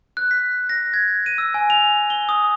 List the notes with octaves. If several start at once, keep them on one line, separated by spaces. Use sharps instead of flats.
F#6
B6
A#6
G#6
D#7
E6
G#5
F7
G7
D#6